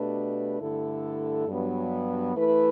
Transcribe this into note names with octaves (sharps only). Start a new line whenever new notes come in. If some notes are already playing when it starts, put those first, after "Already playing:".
Already playing: B2 A3 D4 G4 B4
G2 D3 A3 E4 A4
G2 F#3 B3
E3 A3 E4 B4